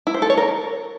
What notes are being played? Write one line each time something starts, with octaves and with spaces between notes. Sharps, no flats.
E4
C5
A4
C#5
A#4